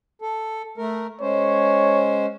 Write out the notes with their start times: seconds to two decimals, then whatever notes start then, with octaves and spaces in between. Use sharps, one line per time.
0.22 A4
0.78 A3 A#4
1.21 G#3 C#4 C5 C#5